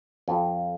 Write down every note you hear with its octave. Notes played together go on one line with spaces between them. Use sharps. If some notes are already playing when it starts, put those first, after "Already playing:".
F2